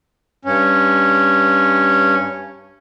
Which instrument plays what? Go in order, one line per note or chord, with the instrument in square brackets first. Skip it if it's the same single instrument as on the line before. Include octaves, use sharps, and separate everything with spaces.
[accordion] G2 C#4